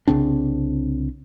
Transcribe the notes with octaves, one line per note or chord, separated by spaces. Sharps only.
C2 C#3 C4 D4